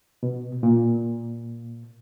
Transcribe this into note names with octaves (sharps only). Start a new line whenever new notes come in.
B2
A#2